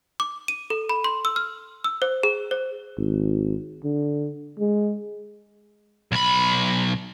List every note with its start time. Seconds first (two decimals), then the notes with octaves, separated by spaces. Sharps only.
0.20 D6
0.48 D#7
0.70 A4
0.89 B5
1.04 C6
1.25 E6
1.36 F6
1.84 E6
2.02 C5
2.23 G#4
2.51 C5
2.98 G#1
3.84 D3
4.59 G#3
6.12 B1 B5